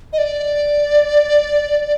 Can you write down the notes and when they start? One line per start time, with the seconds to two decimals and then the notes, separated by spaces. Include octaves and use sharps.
0.13 D#5
0.18 D5